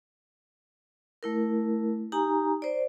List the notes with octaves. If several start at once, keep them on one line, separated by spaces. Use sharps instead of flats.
A3 E4 A#4
D#4 G4 G#5 A#5
C5 D5